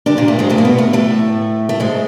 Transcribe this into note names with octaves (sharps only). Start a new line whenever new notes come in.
D3 D4
A#2 A#3
A2 A3
G#2 G#3
A2 A3
A#3
B2 B3
A2 A3
A2 A3
A3
G#2 G#3